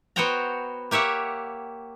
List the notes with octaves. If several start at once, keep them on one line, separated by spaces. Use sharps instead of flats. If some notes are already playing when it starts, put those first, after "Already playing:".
B3 F#4 C5 C#5 G5 A#5
A#3 G4 C#5 E5 F#5